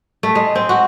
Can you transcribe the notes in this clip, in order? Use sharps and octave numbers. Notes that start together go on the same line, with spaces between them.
A3
G#3
C4
F#4